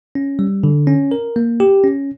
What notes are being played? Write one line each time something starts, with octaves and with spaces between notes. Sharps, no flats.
C#4
G3
D3
C#4
A#4
A#3
G4
C#4